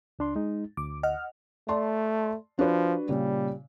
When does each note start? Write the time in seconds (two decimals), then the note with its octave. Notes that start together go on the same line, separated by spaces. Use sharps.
0.19 C#2 D4 C6
0.36 G#3 D#4
0.77 D2 D6
1.03 D#5 F#5 F6
1.68 A3 D5 A5 C6
2.59 F3 D4 F#4 B4
3.09 A#2 C#3 G3